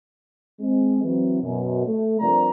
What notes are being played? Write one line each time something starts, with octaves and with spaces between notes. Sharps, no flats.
G#3 C4
E3 F#3 C4
F#2 B2
A3
G2 C3 F3 A#4 D5 A#5